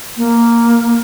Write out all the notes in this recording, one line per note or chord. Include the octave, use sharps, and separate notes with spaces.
A#3